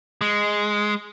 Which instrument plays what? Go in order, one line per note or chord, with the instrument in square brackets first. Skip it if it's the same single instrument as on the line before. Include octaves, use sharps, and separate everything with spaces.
[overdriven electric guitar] G#3